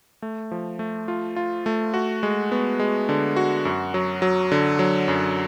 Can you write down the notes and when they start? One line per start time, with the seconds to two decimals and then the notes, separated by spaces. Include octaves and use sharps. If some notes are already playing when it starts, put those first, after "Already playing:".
0.22 A3
0.51 F3
0.79 A3
1.08 F4
1.36 F4
1.66 A3
1.94 F#4
2.23 G#3
2.52 B3
2.79 G#3
3.09 D3
3.36 F#4
3.65 F#2
3.94 F#3
4.22 F#3
4.52 D3
4.79 F#3
5.08 F#2